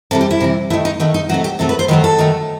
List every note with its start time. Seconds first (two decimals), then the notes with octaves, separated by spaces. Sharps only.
0.11 C3 E3 G3 A4
0.21 G4
0.31 E4
0.40 C3 E3 G3
0.70 A3 E4
0.73 D#3
0.85 D#4
1.00 D#3 A3 B3
1.14 D#4
1.29 C3 F#3 A3 F#4
1.44 G4
1.59 C3 F#3 A3 A4
1.69 B4
1.79 C5
1.88 D#3 F#3 A3 B4
2.04 A4
2.18 D#3 F#3 A3